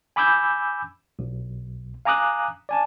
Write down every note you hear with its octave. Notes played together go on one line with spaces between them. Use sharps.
G#5 B5 D6 E6 G6 G#6
B1
F5 G#5 A#5 D6 D#6 F#6
D5 G#5 A5